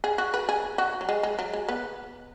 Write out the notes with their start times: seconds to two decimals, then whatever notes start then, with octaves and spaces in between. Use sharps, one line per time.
0.04 G#4
0.18 F#4
0.34 B4
0.49 G#4
0.78 F#4
1.01 F#3
1.09 G#3
1.23 G#3
1.39 F#3
1.53 G#3
1.69 B3